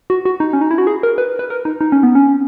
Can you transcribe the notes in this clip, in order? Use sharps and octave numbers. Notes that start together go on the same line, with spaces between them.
F#4
F#4
D#4
C#4
D#4
E4
F#4
G#4
A#4
B4
B4
A#4
D#4
D#4
C#4
B3
C#4